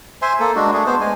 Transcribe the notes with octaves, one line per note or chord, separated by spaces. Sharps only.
C5 E5 G#5 C6
A#3 A4
G#3 D4 F#4
A3 D4 G#4
B3 C5
G#3 G#5